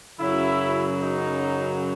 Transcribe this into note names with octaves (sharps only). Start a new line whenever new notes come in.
F#2 C#3 F#3 E4
D#4